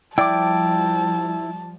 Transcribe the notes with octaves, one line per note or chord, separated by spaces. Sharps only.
F3 G3 E4 D5 G5 A5 D6